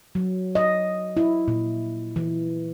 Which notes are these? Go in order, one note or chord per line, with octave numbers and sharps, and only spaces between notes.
F#3
D#5
E4
A#2
E3